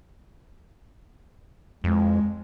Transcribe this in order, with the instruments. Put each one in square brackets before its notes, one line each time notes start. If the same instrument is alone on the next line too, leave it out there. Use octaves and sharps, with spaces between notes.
[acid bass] F2 [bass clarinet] G#3